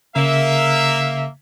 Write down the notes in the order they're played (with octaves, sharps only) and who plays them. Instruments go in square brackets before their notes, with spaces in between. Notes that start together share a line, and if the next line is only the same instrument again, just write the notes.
[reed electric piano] C#3 [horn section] A#3 E5